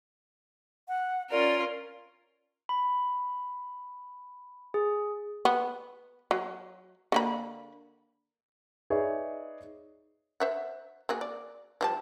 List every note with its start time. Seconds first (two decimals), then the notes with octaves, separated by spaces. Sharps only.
0.88 F#5
1.31 C#4 F4 A#4 D5
2.69 B5
4.74 G#4
5.45 B3
6.31 F#3
7.12 D3 A#3 B5
8.90 D#4 G#4 B4 C#5 D5 E5
10.40 C5 E5 F#5
11.09 A#3 F#4 G#4
11.21 D5
11.81 F3 G3 A5